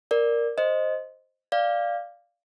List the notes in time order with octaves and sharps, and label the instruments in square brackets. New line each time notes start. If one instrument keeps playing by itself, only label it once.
[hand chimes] A#4 D5
C5 D#5
D5 F5